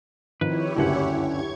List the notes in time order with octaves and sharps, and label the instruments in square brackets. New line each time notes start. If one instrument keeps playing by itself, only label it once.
[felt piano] D#3 F3 C4 [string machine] E4 G4 C#5 [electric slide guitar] B4
[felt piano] F#1 D2 G2 [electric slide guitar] D3 C#4 F#5
[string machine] C#6 G#6